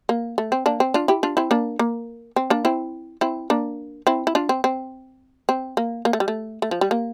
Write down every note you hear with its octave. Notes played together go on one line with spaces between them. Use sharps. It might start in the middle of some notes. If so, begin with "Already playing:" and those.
A#3
A3
C4
A#3 D4
C4
D4 F4
E4 G4
D4 F4
C4 E4
A#3 D4
A#3
C4
A#3 D4
C4 E4
C4 E4
A#3 D4
C4 E4
E4
D4 F4
C4
C4
C4
A#3
A#3
A3
G3
A3
A3
F3
G3
A#3